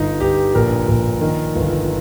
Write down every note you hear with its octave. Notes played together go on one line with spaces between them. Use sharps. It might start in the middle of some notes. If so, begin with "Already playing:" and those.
Already playing: G1 D#4
G1 G4
A#1 A#4
A#1
D#3
G1